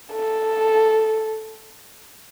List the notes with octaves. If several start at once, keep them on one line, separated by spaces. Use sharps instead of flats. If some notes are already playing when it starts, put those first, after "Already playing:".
A4